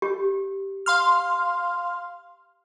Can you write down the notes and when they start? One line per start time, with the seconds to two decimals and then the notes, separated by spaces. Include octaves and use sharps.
0.02 G4
0.86 F5 C6 F6